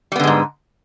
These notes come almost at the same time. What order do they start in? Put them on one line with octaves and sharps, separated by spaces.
G3 B3 D3 G#3 G#2